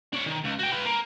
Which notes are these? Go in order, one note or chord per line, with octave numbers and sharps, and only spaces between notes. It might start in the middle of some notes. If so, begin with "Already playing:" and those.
D4 C#5
D#3
C#2
F#4 G5
F4 B4
A#3